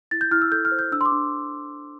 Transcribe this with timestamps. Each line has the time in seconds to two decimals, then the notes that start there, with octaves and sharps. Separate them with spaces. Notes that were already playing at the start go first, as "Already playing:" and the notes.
0.11 E4 A6
0.21 G6
0.31 E4 F6
0.42 E6
0.52 A4 G6
0.65 F6
0.72 C5
0.79 G6
0.92 D4 E6
1.01 C6
1.05 D6
1.12 D4